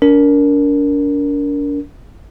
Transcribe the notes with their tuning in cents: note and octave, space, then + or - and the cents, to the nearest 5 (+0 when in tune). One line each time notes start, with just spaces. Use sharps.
D4 -40 A#4 +0